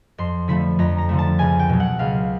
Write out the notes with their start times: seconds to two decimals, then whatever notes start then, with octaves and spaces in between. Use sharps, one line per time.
0.18 F2 C6
0.48 D3 F3 A3 B5
0.79 F2 A#5
0.98 A#5
1.09 D3 F3 A3
1.19 A5
1.39 C#2 G#5
1.59 G5
1.69 B2 F#3
1.80 F#5
1.99 C#2 F5